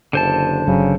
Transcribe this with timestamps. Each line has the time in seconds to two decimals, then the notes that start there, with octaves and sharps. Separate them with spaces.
0.13 F#1 D3 C5 A5
0.67 G1 C#3 F#3